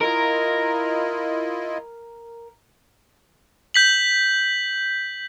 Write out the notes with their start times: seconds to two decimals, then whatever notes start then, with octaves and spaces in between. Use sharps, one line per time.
0.01 E4 F4 A#4 D#5
3.74 G6 B6 F#7